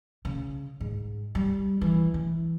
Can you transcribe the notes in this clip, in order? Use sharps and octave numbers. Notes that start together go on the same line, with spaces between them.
C#3
G#2
G3
E3
E3